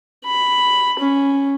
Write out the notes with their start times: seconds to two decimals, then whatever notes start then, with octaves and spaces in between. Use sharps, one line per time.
0.25 B5
1.00 C#4